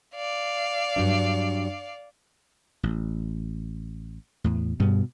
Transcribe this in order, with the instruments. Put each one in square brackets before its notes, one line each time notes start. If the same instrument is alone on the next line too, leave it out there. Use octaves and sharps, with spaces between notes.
[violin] D5 F5
[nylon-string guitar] G2 F#3 D4
[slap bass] A1
E2 A2
[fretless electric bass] G2 [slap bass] B2 B3